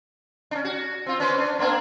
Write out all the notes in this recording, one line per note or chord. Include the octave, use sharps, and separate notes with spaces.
C#4 D4
F#4
C4 F4
C#4 B4 C5
D4
A#3 B3 D4